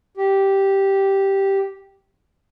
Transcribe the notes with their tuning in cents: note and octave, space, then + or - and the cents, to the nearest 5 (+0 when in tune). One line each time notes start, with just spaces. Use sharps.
G4 -5